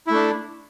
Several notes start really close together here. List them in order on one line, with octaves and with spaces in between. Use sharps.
E4 A3 D4